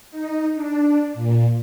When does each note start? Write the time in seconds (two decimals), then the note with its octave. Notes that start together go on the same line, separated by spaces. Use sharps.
0.11 D#4
0.55 D4
1.14 A#2